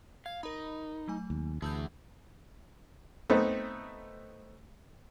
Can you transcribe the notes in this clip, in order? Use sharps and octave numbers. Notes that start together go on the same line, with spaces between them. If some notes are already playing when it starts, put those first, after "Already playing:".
F5 G#6
D#4 A#4 B5
F#3 A3 G#5
D#2
D2 E3 G#4 A5 E6 G6
A3 B3 C4 D#4